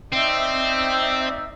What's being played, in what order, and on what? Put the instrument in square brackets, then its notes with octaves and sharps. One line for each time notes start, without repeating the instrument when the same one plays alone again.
[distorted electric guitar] C4 [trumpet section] D#4 D5 E5